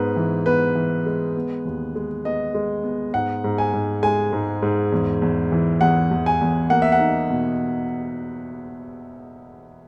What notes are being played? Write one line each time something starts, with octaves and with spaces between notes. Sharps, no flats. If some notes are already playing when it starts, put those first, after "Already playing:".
Already playing: G#2 B3 B4
E3
B3 B4
E3
G#3
B3
D#2
G#3
B3 D#5
G#3
B3
G#2 F#5
G#2
G#5
G#2
G#3 G#5
G#2
G#2
E2
E2
E3
E2 F#5
E2
G#5
E2
A#3 F#5
E5
F#5
D#4
B2